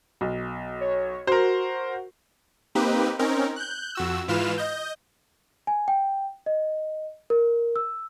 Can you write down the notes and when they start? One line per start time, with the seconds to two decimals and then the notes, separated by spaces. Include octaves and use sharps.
0.21 B1
0.81 C#5
1.27 F#4 A#4 C5
2.75 A#3 C4 D#4 G4 B4
3.19 C4 C#4 D#4 A#4
3.56 F#6 G6
3.95 F2 F#4 E6
4.28 G#2 E3 F4 B4 F6 E7
4.58 D#5 G6
5.67 G#5
5.88 G5
6.46 D#5
7.30 A#4
7.76 E6